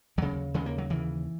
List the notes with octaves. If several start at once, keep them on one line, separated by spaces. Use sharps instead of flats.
D#2 C#3 F#3
D#2 C#3 G#3
A#3
F#3
D#2 C#3 E3